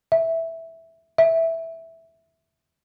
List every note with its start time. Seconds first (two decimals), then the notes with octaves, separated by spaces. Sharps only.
0.12 E5
1.18 E5